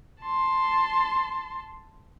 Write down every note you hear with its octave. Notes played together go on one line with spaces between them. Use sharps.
A5 C6